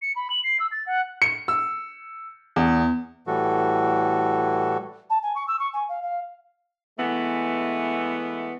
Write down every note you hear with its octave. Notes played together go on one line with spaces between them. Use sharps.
C#7
B5
F#7
C7
E6
A6
F#5
C#7
E6
E2
A2 E3 G3 F#4 A4
A5
G#5
C#6
E6
C#6
G#5
F5
F5
E3 G#3 A3 B3